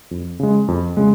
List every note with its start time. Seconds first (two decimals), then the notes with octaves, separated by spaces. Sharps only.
0.11 F2
0.40 C#3 G#3
0.68 F2
0.97 C#3 G#3